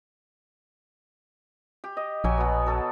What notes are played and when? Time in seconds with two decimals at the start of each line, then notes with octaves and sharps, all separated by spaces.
1.84 G4
1.97 D#5
2.24 A#1 F#3 G#5
2.38 B2 B3
2.66 F#3 A4 A5